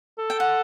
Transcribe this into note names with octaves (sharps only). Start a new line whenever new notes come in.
A4
G5
F#5